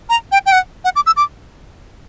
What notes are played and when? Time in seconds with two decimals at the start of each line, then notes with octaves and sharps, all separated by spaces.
0.09 A#5
0.32 G5
0.46 G5
0.52 F#5
0.84 F#5
0.96 D6
1.06 E6
1.16 D6